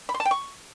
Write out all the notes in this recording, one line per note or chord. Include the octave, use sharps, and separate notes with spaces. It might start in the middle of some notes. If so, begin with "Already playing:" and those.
B5
C6
A5
G5
C#6